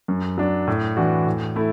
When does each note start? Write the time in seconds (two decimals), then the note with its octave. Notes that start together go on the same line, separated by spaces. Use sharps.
0.08 F#2
0.38 F#3 D4
0.67 A2
0.97 E3 D4 F#4
1.26 A2
1.56 A3 E4